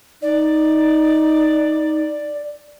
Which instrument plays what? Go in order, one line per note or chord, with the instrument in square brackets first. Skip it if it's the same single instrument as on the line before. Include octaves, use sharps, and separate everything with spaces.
[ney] D#4 [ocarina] D5